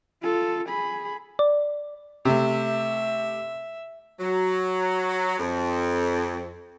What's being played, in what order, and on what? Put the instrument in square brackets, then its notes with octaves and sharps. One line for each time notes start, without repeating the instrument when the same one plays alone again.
[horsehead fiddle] F4 A4
G#4 B5
[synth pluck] D5
[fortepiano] C3 [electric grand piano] A3 G4 [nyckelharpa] E5
[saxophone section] F#3
F2